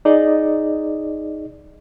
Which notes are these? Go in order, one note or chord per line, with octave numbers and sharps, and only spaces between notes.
D#4 G#4 D5 D#5